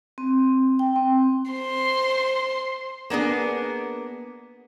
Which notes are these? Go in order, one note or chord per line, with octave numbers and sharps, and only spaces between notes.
C4
G5
C4
C5 C6
A#3 B3 D4 G#4